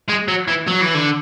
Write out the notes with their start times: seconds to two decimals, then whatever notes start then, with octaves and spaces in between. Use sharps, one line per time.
0.09 G#3
0.28 F#3
0.48 E3
0.67 F#3
0.81 E3
0.94 D3